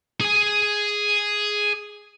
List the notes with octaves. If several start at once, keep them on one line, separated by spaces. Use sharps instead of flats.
G#4 G#5